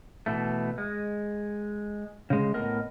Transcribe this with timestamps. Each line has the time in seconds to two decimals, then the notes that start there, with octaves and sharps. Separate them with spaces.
0.26 B2 E3 A3
0.78 G#3
2.30 C#3 G#3
2.54 A2 B3 A#4 D#5